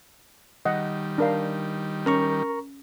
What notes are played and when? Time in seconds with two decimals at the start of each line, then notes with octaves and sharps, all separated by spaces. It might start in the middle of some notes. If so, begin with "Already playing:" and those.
0.65 D#3 G3 D#5 F#5
1.18 D4 A#4 F5
2.06 C#4 A#4 A#5 C#6